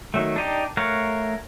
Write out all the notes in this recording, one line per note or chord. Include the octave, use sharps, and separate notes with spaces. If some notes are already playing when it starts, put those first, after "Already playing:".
D#3 F#3 A3
D4 D#4 G4
A3 A#4 C#5 F5 F#5